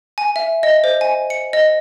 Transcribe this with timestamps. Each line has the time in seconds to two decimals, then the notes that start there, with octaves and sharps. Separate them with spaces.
0.18 G#5
0.36 E5
0.63 D#5
0.84 C5
1.01 G#5
1.30 C#7
1.53 D#5